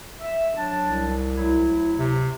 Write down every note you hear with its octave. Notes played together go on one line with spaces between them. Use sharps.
E5
F#3 D4 A5
C2
D2 F#3 E4
C3